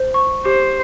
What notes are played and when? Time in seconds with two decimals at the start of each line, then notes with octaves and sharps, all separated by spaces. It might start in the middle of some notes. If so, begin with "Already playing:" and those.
Already playing: C5
0.14 C#6
0.45 G4 C5